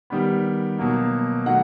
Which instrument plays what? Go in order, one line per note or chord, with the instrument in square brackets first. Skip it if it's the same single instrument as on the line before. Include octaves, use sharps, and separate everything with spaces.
[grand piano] D#3 G3 B3
B2 F#3 A#3
D#3 F#3 A3 F#5